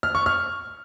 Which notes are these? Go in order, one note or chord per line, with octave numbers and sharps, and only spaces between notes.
F6
C#6
F6